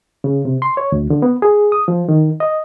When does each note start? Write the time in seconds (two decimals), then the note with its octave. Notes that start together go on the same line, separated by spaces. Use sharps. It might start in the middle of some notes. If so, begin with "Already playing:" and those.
0.24 C#3
0.45 C3
0.62 C6
0.77 C#5
0.92 D2
1.10 D3
1.22 B3
1.42 G#4
1.72 D#6
1.88 F3
2.09 D#3
2.40 D#5